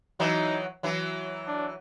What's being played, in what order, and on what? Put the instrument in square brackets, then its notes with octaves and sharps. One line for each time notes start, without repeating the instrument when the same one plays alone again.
[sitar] E3 F#3 [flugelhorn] D#4
[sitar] E3 F#3
[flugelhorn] D4